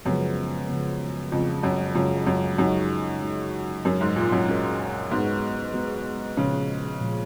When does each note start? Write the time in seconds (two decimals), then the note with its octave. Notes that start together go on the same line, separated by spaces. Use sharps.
0.05 F#2 C#3 F3 G#3 B3
0.69 C#3 F3 G#3 B3
1.32 F2 C#3 G#3 C#4 F4
1.63 F#2
1.95 F#2 C#3 G#3 C#4 F4
2.27 F#2
2.58 F#2 G#3 D#4 F#4
3.22 G#3 D#4 F#4
3.85 F#2 G#3 C#4 F#4 A#4
4.01 G#2
4.16 A#2
4.32 F#2
4.48 G#3 C#4 F#4 A#4
5.11 G#2 G#3 B3 F#4
5.74 G#3 B3 F#4
6.37 A#2 C#3 F3 G#3
7.01 A#2 F3 G#3